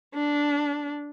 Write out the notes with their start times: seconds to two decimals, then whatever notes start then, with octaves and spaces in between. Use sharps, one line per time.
0.14 D4